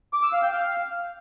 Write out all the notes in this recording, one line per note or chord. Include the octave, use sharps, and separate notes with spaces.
D6
E6
F5
G5
F5